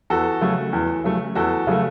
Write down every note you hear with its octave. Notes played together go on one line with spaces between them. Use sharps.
E2 F#4 A4
C#3 F#3 A3
E2
C#3 F#3 A3
E2 F#4 A4
C#3 F#3 A3